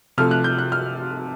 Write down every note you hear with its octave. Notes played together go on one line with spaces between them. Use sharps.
C3 F3 A3 F6
F#6
G6
F#6
F6